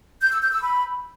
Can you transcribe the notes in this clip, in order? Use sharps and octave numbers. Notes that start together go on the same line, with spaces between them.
G6
E6
G6
E6
B5